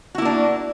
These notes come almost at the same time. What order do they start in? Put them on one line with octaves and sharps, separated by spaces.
F#4 E4 A#3 D4